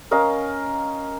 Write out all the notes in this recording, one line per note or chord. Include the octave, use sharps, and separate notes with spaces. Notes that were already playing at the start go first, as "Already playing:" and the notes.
C#4 A#4 D#5 F5